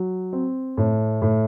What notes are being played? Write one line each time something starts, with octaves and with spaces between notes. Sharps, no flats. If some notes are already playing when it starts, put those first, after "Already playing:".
Already playing: F#3
C4
A2
A2